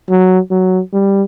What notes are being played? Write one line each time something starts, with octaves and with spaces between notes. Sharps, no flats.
F#3
F#3
G3